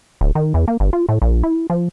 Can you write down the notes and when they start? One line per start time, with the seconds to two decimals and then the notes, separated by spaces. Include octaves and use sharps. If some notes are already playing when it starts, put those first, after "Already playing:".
0.21 D1
0.35 D#3
0.54 E2
0.68 A#3
0.80 G1
0.93 F4
1.09 A2
1.22 A#1
1.43 E4
1.70 F3